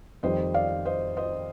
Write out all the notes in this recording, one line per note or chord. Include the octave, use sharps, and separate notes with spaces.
F2 D#3 G3 C5 D#5
D5 F5
C5 D#5
C5 D#5